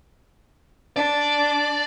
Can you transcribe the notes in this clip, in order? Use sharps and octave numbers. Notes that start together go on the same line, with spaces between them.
D4 D5